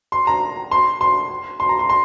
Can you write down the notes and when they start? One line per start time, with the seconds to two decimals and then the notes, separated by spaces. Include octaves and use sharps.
0.12 C6
0.27 A#5
0.71 C6
1.01 C6
1.60 C6
1.69 A#5
1.79 C6
1.89 C6